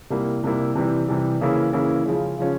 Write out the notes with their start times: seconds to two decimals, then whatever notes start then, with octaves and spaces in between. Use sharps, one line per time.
0.10 C3 G3 A#3 E4
0.44 C3 G3 A#3 E4
0.75 C3 E3 G3
1.08 C3 E3 G3
1.41 C#3 E3 A#3 C#4 E4
1.73 C#3 E3 A#3 C#4 E4
2.05 C#3 F3 G#3 C#4
2.38 C#3 F3 G#3 C#4